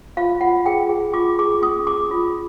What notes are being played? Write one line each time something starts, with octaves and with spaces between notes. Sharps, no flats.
F4 F5
F4 F#5
G#4 G5
G#4
F4 D6
G#4 D6
C#4 D#6
G#4 D6
F4